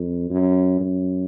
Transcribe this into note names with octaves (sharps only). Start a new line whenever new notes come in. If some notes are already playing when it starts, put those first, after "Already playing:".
Already playing: F2
F#2
F#2